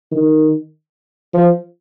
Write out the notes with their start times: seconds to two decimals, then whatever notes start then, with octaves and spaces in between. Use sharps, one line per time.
0.12 D#3
1.34 F3